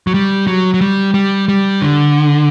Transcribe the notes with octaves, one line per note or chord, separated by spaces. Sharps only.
F#3
G3
F#3
F#3
G3
G3
G3
D3